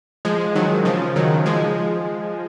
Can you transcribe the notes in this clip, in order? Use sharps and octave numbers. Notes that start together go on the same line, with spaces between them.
F3 G#3
D#3 F#3
C#3 F3
D#3 F#3
F3 G#3